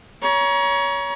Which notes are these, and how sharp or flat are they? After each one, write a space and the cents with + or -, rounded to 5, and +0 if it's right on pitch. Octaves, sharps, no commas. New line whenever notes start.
C#5 +20 A#5 +35